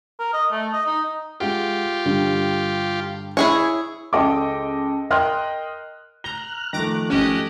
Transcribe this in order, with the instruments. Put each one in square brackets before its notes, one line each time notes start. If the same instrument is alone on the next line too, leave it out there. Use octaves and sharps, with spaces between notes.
[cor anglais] A#4
D#5
A3
D#5
D#4
[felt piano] G#3 F#5 D7 [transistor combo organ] F4 G4
[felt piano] G2 D3 G3
[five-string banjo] E4 G#4 C#5
[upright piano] C#2 A4 D#5 G5 D6
A#4 D#5 G5 C6 F6 F#6
[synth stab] A#5 [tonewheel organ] F6 F#6 [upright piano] G7
[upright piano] D#3 A3 [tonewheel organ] F3 F#6 [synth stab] A#5 D6
[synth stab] G#1 C#4 [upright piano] A3 [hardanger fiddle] G4 D#5